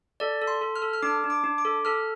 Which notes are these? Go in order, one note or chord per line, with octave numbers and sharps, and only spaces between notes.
A4 D5
A4
C6
A4
F6
A4
F6
D4 D6
D4
D6
D4
D6
A4
A4 F6